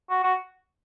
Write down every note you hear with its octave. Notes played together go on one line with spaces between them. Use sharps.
F#4
F#4